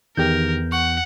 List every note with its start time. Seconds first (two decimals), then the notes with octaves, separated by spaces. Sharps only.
0.17 E2 D#3 G4 A#4 G6
0.72 F#5 C#6